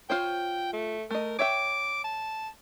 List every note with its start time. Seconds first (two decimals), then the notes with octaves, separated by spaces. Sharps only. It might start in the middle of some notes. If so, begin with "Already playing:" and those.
0.10 F4 C5 C#5 G5
0.73 A3
1.11 A3 A#4 D#5
1.39 C#5 E5 G5 D6
2.04 A5